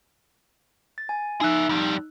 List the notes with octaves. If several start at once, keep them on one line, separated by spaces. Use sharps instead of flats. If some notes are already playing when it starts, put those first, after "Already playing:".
A6
G#5
D#4 G#4 E5 E6 F#6
F2 G3